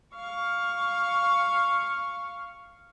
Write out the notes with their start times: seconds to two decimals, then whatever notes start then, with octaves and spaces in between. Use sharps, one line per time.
0.14 F5 C#6